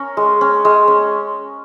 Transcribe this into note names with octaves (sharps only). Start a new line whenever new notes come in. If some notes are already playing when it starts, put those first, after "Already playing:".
Already playing: C#4 A#4
G#3
C#4
G#3
C#4